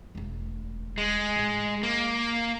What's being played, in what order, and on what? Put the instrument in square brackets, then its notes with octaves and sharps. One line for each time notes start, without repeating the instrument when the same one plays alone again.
[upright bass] E1 A3
[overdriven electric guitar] G#3
[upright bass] B1 A2
[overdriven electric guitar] A#3